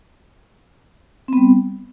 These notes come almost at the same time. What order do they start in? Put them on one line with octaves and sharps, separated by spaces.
C4 B3 G3